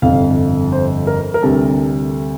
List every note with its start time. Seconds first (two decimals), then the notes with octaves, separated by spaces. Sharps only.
0.02 G1 F2 C3 F3 F5
0.72 C5
1.07 A#4
1.34 A#4
1.42 D2 C3 G3 A4